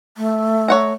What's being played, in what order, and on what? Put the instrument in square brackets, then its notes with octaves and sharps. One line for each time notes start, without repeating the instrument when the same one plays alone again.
[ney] A3
[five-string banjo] C#5 F#5 A#5